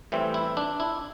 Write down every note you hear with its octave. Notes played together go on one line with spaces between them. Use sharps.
A2 E3 G3 C4
E4
D4
E4